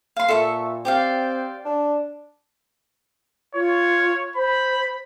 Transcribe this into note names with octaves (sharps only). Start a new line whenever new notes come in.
F5 C6
A#2 A4 E5 C#6
C4 G4 D5 F5
D4
F4 C#5
C5 B5